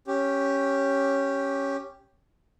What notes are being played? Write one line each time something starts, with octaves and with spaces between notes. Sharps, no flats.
C#4 G4